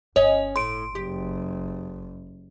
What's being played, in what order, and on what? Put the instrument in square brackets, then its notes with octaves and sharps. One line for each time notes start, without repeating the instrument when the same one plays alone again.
[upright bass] G1 [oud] C#4 D#5 [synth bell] C#5
[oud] A2 [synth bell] C6 D7
[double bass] F#1 [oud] G4